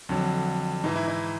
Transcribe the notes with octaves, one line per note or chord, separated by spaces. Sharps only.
F2 D3 F#3
G#2 E3 D#4
E4
D#4